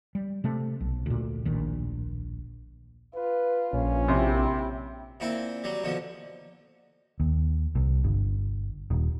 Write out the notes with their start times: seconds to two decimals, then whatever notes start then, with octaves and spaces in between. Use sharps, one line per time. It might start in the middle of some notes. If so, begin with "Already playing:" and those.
0.15 G3
0.44 C3 A3
0.80 B1
1.06 D2 A#2
1.45 D1 A#1 A#2 D#3
3.15 F4 B4
3.73 A#1 C#4
4.08 C3 E4 G4
5.20 A#2 C4 E4 G5
5.64 F#3 G3
5.83 B2 D3 F3
7.20 D#2
7.75 C2
8.04 G1
8.90 D#1